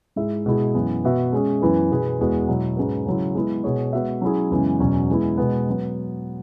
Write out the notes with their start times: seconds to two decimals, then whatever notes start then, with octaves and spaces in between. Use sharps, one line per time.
0.16 G#2 G#3 E4 G#4 E5
0.46 B2 G#3 E4 G#4
0.75 F#2 E3 B3
1.04 B2 B3 F#4 E5
1.32 G#3 C#4 G#4
1.62 F#2 E3 B3 E4 B4
1.90 B2 B3 G#4 B4
2.19 E2 E3 G#3 B3 F#4
2.48 B2 F#3 E4
2.77 G#2 G#3 C#4 F#4 B4
3.06 C#3 F#3 E4
3.35 G#3 B3 E4 G#4
3.64 B2 B3 G#4 C#5
3.93 G#3 B3 F#4 E5
4.21 F#3 C#4 E4 G#4
4.50 F#2 C#3 E3 G#3 B3
4.80 E2 B2 F#3 C#4
5.09 E3 G#3 B3 E4
5.37 B2 G#3 B3
5.69 F#3 B3